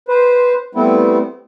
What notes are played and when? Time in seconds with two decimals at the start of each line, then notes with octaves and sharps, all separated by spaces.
0.08 B4 C5
0.75 G3 A3 B3 C4 E4